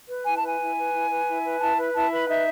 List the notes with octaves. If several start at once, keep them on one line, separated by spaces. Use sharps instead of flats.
B4
E4 G#5
A5
B4 G#5
E4
B4
E4
B4
E4
B4
E4 A5
B4
E4 A5
B4 B5
D#4 E5